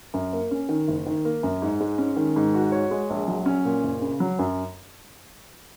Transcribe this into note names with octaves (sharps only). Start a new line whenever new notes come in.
F#2
A#3
C#4
D#3
F#1
D#3
A#3
F#2
G#2
G#3
C#4
D#3
G#2
F#4
C#5
G#3
A#1
F#3
C#4
A#2
F#1
C#3
F#3
F#2